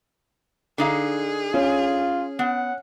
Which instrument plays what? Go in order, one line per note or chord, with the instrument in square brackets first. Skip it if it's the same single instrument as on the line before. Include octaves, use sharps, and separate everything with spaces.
[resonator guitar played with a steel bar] D3 D#4 F5 [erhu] G#4
[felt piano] C#4 [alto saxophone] F4
[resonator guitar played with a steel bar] B3 [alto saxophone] F#5